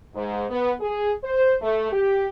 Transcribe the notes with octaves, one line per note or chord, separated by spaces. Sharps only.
G#2
B3
G#4
C5
A3
G4